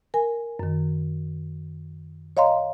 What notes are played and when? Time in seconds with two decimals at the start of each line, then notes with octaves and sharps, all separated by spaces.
0.14 A#4 G#5
0.59 F#2 D#3
2.37 C#5 D#5 F5 A#5 C6